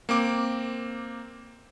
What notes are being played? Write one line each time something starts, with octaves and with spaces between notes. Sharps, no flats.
A#3 C4 D6